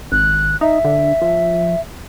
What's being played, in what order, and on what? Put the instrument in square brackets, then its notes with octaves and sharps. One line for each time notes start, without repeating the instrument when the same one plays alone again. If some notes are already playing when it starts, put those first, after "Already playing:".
[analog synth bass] G#1 [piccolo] F#6
[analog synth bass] D#4 [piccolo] E5
[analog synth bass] D3
F3